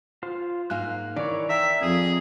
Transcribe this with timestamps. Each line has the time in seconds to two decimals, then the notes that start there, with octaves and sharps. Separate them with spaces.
0.23 F4 C5
0.70 G#2 A#3 F5 F#6
1.16 D#3 E3 C#5 D5
1.49 E5 F5 G5 A#5
1.82 F2 G#4